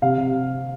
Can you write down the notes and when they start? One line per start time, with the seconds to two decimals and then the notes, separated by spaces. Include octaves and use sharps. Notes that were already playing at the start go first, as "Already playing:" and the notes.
0.02 C3 F5
0.18 C3